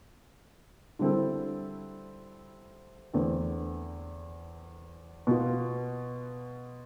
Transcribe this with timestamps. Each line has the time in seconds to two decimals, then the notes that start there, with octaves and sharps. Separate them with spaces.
0.99 D3 G3 C4 E4 A4
3.13 E2 D3 A3 C4
5.27 B2 B3 F4